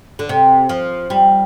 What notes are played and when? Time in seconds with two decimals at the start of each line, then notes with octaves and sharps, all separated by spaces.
0.19 D3
0.29 C3
0.69 F3
1.10 G3